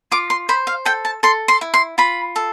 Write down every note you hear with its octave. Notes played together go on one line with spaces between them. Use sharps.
F4 D6
C6
C5 B5
F5
A4 G5
A5
A4 C6
C6
E4
C6
F4 B5
A4